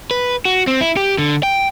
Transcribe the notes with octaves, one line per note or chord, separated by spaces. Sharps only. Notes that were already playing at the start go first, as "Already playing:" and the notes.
B4
F#4
C4
E4
G4
D3
G5